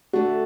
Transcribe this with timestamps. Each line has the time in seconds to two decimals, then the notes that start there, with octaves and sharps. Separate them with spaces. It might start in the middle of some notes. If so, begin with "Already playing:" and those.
0.13 D3 A3 D4 F#4